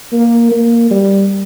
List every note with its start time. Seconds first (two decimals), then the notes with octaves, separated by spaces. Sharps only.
0.13 A#3
0.52 A#3
0.91 G3